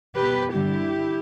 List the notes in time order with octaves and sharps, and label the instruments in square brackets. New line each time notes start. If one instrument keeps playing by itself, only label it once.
[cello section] B2 B3 G4 B4
G2 D3 G3 E4 G4